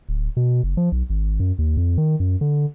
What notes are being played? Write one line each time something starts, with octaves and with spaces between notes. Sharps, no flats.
D1
B2
F#1
F3
B1
G#1
F#2
D#2
F2
D#3
F#2
D3